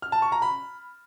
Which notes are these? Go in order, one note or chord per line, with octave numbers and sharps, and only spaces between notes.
F6
A5
C#6
A#5
B5